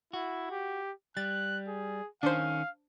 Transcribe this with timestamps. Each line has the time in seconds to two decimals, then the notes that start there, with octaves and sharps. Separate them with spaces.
0.13 E4 F#4
0.51 G4
1.17 G3 F#6 A6
1.68 G#4
2.23 D#3 C#4 D4 C5 F5